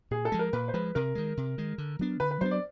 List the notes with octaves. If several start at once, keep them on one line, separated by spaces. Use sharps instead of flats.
A#2 G#4
A4
F3 G#3
A#4
A#2 B4
C5
F3 G#3 B4
C3 A#4
D#3 G#3
C3
D#3 G#3
D3
F#3 B3 D4
D3 B4
B4
F#3 B3 D4 C5
D5